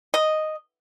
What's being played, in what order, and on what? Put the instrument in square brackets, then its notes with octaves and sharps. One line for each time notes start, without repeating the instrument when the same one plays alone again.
[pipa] D#5